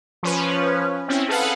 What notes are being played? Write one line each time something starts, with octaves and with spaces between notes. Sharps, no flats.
F3 C#4 B4
C4 C#4 E4
G#4 A4 B4 F5 F#5